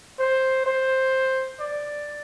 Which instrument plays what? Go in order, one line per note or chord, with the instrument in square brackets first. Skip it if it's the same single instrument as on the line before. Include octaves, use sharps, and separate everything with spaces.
[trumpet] C5
C5
D5